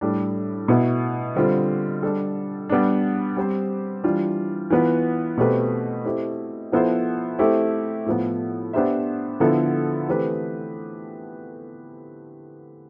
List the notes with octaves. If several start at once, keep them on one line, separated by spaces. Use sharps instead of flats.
A2 G3 D4
B2 B3 E4
D3 G3 C4 F4
G3 D4 A4
G3 B3 D4
G3 C4 G4 C5
E3 G3 D4 F4
E3 B3 F4 B4
B2 A3 C4 G4 B4
A3 C4 E4 G4
F3 B3 E4 A4 C5
A3 C4 E4 G4
A2 F3 B3
B3 D4 G4 C5 E5
D3 F3 B3 E4 A4
E3 A3 C4 G4 B4